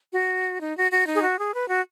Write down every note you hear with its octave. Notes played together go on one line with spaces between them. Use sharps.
F#4
D#4
F#4
F#4
D#4
G#4
F#4
G#4
B4
F#4